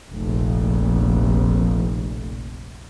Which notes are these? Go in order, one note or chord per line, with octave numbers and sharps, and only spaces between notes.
F1 A#1